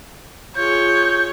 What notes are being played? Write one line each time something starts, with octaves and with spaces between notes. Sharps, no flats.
F4 G#4 C#5 G6